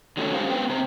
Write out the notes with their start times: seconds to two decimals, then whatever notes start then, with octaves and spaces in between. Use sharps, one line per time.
0.17 D3 D#3 F#3 A3 C#4 D#4
0.34 F#3 G#3 C#4 G4 C5 F5
0.50 A#3 B3 B4 G5
0.69 C#3 C4 C5